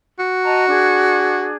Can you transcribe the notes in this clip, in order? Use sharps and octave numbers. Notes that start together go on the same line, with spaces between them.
F#4
D#5 A5 A#5
D4 G#4